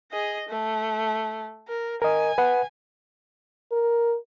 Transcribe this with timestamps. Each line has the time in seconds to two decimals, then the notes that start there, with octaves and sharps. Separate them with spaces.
0.12 G#4 D#5
0.49 A3
1.68 A#4
2.02 A#4 D#5 G#5
2.38 B4 F#5
3.72 A#4